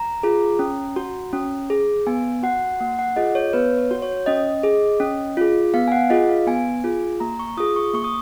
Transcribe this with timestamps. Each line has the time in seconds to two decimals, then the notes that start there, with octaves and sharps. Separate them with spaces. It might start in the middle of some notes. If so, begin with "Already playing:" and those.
Already playing: A#5
0.23 F4 G#4
0.59 C#4
0.96 F#4
1.33 C#4
1.70 G#4
2.07 B3 G#5
2.43 F#4 F#5
2.80 A#3 F#5
2.99 F#5
3.16 F4 G#4 D#5
3.35 C#5
3.53 B3 B4
3.77 C#5
3.91 F#4
4.02 C#5
4.26 C#4 D#5
4.63 G#4
5.00 C#4
5.37 F4 G#4
5.74 B3 F5
5.88 G#5
5.92 F#5
6.10 F4 G#4 D#5
6.29 F5
6.47 B3 G#5
6.84 F4 G#4
7.20 A#3 A#5
7.39 C#6
7.57 F4 G#4 D#6
7.76 C#6
7.94 A#3 C#6
8.04 D#6